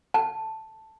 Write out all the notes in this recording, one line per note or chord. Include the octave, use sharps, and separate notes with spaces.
A5